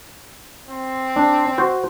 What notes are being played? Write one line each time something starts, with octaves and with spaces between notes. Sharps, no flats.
C4
D4
F#4 C5